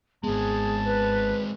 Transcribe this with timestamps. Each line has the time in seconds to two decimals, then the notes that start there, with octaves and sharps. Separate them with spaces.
0.24 G#1 G#3 B3 C4 G#4 A5
0.85 B4